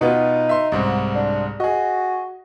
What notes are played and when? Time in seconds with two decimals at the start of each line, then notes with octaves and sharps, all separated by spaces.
0.01 B2 B3 D#4 F4
0.49 E5 C6
0.72 C2 G#2 C4
1.15 D4
1.60 F#4 G#4 D#5